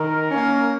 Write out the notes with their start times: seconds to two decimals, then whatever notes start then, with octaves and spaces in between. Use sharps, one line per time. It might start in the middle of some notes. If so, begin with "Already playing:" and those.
Already playing: D#3 A#4
0.31 A#3 C#4